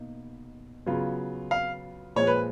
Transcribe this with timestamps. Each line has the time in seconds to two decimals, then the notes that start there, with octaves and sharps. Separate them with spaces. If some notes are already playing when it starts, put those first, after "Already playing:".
Already playing: B2 A#3 D#4
0.86 C#3 F#3 B3 F4
1.51 F5
2.16 A#2 F3 G#3 C#5
2.27 B4